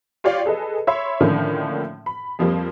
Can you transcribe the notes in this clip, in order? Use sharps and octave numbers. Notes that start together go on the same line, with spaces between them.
F4 G4 C#5 D5 F5
G#4 A4 B4 D#5
C#5 E5 B5 C6
A2 D3 D#3 F3 A#3 C#4
B5
F2 F3 G3 A#3 C4